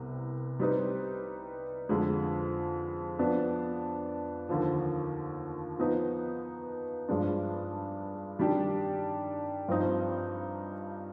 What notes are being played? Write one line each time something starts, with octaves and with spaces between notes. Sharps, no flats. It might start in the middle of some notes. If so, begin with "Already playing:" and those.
Already playing: C2 C3 B3
G3 C4 D#4 B4
F2 D3 G#3
F3 B3 D4
D#2 D3 F3
F3 B3 D#4 B4
G2 F3 G#3 D4
D#3 G3 D4 G4
G2 F3 C4 D#4